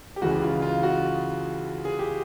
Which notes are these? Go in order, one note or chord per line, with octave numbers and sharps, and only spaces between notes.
G4
C#2 C#3 E3 G#3 F#4
F4
F4
F#4
G#4
G4